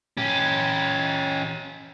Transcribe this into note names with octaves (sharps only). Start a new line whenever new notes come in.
C#4 G4